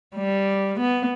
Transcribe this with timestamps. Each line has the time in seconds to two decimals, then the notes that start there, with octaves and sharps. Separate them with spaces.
0.16 G3
0.80 B3